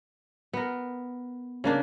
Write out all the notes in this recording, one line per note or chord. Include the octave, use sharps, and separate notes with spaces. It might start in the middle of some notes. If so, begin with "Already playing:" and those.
B3 A#4
C#3 A#3 D4